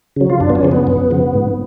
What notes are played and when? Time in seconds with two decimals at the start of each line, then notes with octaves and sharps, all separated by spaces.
0.16 C#3 F#3
0.30 F4
0.40 F#2 D4
0.50 B3
0.55 C#4
0.63 C#3 F3
0.72 B3
0.87 F#2
1.10 C#3 F3
1.34 G#2